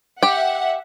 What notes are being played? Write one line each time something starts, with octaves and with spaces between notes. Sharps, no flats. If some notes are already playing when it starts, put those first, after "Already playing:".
G4 E5 F#5 G5